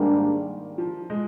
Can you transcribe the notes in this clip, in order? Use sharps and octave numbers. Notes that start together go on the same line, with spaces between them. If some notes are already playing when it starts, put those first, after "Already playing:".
Already playing: G#2 D#3 G3 A#3 D4
F3
G#3